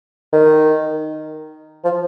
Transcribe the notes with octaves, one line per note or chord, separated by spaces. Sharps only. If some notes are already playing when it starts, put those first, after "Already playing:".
D#3
F3